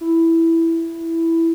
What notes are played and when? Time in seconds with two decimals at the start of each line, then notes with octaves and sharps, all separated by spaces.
0.01 E4